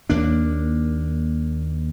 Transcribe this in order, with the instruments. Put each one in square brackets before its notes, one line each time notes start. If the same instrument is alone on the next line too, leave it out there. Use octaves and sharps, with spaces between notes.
[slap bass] D#2 A#3 D4